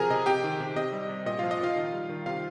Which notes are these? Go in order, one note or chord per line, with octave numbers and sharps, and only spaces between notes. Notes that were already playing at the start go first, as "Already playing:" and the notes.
Already playing: C3 F3 G#4 A#4 G#5 A#5
C3 D#5
C3 G4 G5
D#3
C3
C3 D#5
G3
C3
A#2 D#5
F3 F4 F5
D#5
A#2 F4 F5
D#3
G3
D#3
C3 F4 F5